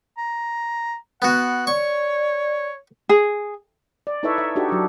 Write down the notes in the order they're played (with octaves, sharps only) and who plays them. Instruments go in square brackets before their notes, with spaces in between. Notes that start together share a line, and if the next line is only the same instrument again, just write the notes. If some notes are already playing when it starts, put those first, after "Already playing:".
[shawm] A#5
[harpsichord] B3 F#4 [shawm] F#5
[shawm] C#5 [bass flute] D5 [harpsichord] C#6
[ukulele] G#4
[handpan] D5
D#4 E4 A4 B4 C#5 E5
E5
D4 D#4 F#4 G4 A4
F#3 D4